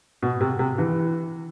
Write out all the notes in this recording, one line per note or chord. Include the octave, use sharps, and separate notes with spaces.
B2
C3
C3
E3